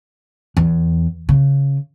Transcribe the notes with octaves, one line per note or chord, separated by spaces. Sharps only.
E2
C#3